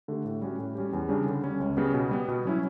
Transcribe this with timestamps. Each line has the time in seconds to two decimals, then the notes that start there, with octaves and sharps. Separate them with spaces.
0.08 D3 A3 D4 G4
0.25 A2
0.42 G3 C#4 F#4
0.59 A2
0.75 G3 C#4 G4
0.93 E2
1.09 C#3 G3 D4
1.26 D3
1.44 G3 C#4
1.60 C#2
1.77 C#3 G3 B3
1.94 B2
2.11 G3 B3
2.28 B2
2.45 F#3 C#4 E4